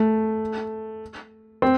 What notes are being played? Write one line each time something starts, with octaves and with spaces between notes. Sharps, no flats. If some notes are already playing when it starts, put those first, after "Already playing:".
Already playing: A3
C4